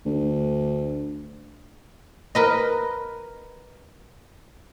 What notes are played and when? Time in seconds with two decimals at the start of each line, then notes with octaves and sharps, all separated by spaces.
0.06 D2
2.35 A#4 B4 D#5